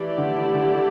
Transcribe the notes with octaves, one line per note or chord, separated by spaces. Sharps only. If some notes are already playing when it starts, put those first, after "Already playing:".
Already playing: E3 A3 E4 G4 D5
D3
D3